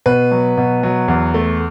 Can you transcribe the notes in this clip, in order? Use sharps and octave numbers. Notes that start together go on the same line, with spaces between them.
B2 B4
F#3
B2
F#3
E2
A3